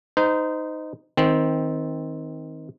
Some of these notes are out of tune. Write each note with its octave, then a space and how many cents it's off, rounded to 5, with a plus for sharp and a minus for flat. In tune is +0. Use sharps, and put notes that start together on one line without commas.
D#4 +0 C5 -30
D#3 +20 C4 +0